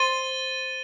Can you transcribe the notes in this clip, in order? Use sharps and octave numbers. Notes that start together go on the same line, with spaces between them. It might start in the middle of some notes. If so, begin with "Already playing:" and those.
Already playing: C5 A6 D#7 G7